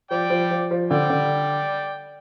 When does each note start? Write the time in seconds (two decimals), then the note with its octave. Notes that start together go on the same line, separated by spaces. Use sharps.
0.10 F3 D5 G5
0.30 F3
0.51 F3
0.71 F3
0.90 D3 D5 G5
1.10 D3